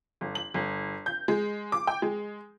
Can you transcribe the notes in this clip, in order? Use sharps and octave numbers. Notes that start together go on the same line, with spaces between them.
G1
F#7
G1
G6
G#3
D6
G5
G#3